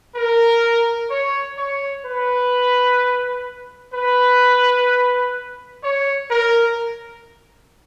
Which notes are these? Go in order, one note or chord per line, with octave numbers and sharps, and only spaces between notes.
A#4
C#5
C#5
B4
B4
C#5
A#4